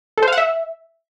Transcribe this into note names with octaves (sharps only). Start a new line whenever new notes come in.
A4
C5
F5
F#5
E5